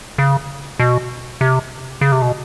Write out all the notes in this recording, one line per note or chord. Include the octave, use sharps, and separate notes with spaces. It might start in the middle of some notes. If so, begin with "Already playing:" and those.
C#3
B2
C3
C#3
C3
B2